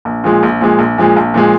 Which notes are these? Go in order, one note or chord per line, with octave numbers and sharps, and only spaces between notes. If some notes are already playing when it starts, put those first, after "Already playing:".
A#1
A#2 F3 G#3
A#1
A#2 F3 G#3
A#1
A#2 F3 G#3
A#1
A#2 F3 G#3